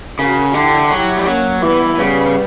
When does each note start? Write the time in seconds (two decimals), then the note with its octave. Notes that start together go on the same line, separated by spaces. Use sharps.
0.18 C#3 F#4 A#4
0.54 D3 E4 G4
0.90 F#3 E4 G4
1.17 G3
1.26 F#3 A#3 C#4
1.62 E3 G3 B3
1.98 C#3 G3 B3